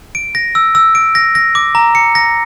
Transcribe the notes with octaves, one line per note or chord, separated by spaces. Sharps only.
D7
A#6
E6
E6
D7
A#6
A#6
D6
A#5
C#7
A#6